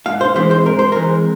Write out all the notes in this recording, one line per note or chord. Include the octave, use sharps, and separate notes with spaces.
G#2 F5
C5
E3 G#3 C4 C5
C5
G#2 A#4
C5
E3 G#3 C4 A#4